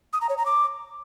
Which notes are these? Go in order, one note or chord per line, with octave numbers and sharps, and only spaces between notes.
D#6
A#5
C#5
A#5
D6